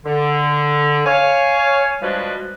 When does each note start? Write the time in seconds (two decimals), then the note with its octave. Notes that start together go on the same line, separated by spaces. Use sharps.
0.05 D3
1.05 C#5 F5 G#5
2.02 F3 G3 G#3 D4 F#4 B4